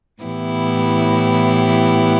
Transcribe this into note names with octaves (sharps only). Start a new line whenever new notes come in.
A2 E3 B3 E4 G4